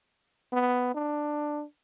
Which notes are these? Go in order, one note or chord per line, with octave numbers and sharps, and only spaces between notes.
B3
D4